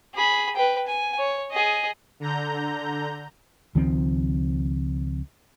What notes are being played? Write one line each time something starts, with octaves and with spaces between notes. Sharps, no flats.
G#4 B5
B4 G5
G#5
C#5
G#4 D#5
D3 A#5 G6
C#2 D#3 F3 C4